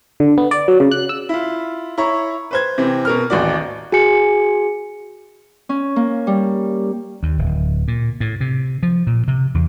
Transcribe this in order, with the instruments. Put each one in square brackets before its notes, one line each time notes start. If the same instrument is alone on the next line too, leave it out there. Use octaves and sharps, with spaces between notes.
[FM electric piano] D3
B3
D5
F#3
C#3
F#6
E6
[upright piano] E4 F4
E4 C#5 A#5 C#6
B4 C5 G#6
C3 E3 C4
B2 A#4 F6
D#1 A1 F#4 D5
[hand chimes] F#4 G#4 G#5 C#7
[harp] C#4
A#3
G3
[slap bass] D#2
D1
A#2
A2
C3
F3
A#2
C3
E2